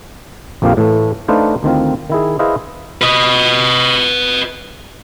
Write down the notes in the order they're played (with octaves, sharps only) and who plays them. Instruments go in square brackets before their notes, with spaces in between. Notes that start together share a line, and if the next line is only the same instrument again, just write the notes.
[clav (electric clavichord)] A#1 F2 F3 A#3 G4 F5
A2 E3 A3
A3 D4 D#4 B4 C5 F5
D2 D#3 C4 F4
D#3 E4 G#4
E4 G#4 B4 C5 D#5 F5
[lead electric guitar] B4 D#5